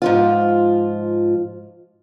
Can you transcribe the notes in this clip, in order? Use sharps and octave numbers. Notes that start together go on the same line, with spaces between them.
G#2 F3 F4